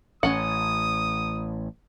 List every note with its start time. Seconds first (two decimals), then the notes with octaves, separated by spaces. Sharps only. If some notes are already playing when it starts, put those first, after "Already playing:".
0.23 A1 A2 C#4 F#5 D#6